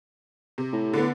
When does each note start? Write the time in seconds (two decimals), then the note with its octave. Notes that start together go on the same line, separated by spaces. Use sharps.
0.58 C3
0.73 A2
0.93 D3 B3